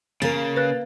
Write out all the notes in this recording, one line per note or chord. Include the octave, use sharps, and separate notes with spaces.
C#3 A#3 A#4 A6
B4 F#6